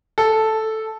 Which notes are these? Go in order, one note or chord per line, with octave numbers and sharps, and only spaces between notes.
A4